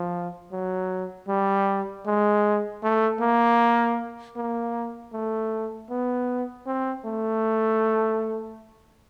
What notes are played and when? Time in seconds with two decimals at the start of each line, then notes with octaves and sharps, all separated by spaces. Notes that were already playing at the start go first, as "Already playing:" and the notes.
Already playing: F3
0.52 F#3
1.28 G3
2.06 G#3
2.83 A3
3.20 A#3
4.36 A#3
5.13 A3
5.90 B3
6.66 C4
7.05 A3